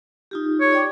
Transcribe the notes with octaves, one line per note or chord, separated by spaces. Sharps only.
D#4 F4 G4
C#5
D5 G5 D6